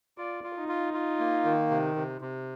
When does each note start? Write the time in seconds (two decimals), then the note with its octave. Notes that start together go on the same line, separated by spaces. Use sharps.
0.18 F4 D5
0.44 F4
0.56 D#4
0.68 F4
0.94 F4
1.19 A#3
1.45 D#3
1.71 C3
1.96 C3
2.21 C3